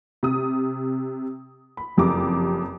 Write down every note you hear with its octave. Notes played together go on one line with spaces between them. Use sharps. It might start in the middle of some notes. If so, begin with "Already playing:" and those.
C3 D#6
B5
F#1 F2 G4 A#5 D6